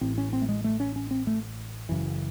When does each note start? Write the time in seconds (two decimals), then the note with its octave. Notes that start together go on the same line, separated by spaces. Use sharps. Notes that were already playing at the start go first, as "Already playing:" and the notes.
0.01 A1 A2 C4
0.18 C#4
0.33 C4
0.42 A3
0.49 G#3
0.64 A3
0.80 C#4
0.96 C#4
1.11 C4
1.27 A3
1.89 F#1 F#2 C#3 E3